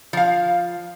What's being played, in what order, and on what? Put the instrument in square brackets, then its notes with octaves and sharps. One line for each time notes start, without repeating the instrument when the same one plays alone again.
[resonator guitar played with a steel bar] F3 F5